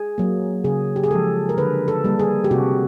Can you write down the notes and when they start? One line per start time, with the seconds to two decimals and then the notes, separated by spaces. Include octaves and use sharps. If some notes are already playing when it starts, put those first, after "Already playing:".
Already playing: G#4
0.18 F#3 A#3
0.64 C#3 G#4
0.96 G4
1.04 G#4
1.11 F3 G#3 A4
1.49 A#4
1.57 D3 B4
1.88 A4
2.04 G3 A#3
2.19 G#4
2.44 G4
2.51 C3 F#4